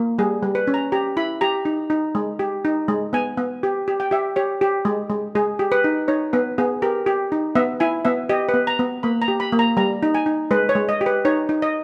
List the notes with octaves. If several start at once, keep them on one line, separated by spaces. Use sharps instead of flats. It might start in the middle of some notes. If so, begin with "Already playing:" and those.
Already playing: A#3
G3 G#4
G3
B4
C#4
A#5
G4 A#5
E4 B5
G4 A#5
D#4
D#4
G#3
G4
D#4
G#3
B3 G#5
B3
G4
G4
G5
G4 E5
G4 C#5
G4
G#3
G#3
G#3 G#4
G4
B4
D#4
D#4 C#5
B3 B4
B3 G#4
G4 A#4
G4
D#4
B3 E5
E4 G#5
B3 E5
G4 D#5
B4
B3
A#5
B3
A#3 B5
A#5
G4
B5
A#3
A#5
G3 A#5
D#4
G#5
D#4
G#3 B4
C#5
G#3
D#5
G4
B4
D#4 C#5
D#4
D#5